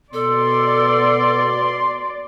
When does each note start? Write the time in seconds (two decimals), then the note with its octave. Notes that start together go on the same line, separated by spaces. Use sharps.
0.13 B2 A4 D5 C6